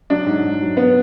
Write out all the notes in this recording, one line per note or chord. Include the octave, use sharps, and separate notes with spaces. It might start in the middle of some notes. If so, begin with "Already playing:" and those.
F#3 D4
G#2
G#2
F#3
B3